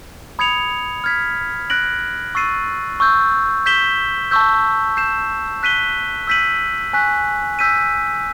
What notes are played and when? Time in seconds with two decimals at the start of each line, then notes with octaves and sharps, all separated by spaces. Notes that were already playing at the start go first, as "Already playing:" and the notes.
0.39 B5 D#6 G#6 C#7 F7
1.04 F6 G#6 B6
1.70 F#6 A#6 D7 F#7
2.35 C#6 E6 A6 C7 D#7
3.00 C#6 E6 G6
3.66 G6 B6 E7 G7
4.31 A5 C#6 E6 G6
4.97 G6 C7 E7
5.63 F#6 B6 D#7 G7
6.27 E6 G6 B6 D#7 F#7
6.93 G#5 C#6 F#6 B6
7.59 E6 G6 B6 D#7